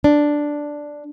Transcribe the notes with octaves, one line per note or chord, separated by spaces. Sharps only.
D4